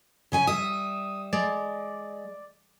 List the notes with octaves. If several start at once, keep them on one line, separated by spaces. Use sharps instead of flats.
C#3 C#4 G#5
G3 E5 D#6
G#3 D5